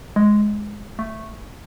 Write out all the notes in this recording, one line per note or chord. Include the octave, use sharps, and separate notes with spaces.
G#3
A3